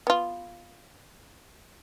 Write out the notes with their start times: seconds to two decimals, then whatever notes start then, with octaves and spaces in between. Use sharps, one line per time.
0.07 B3 F4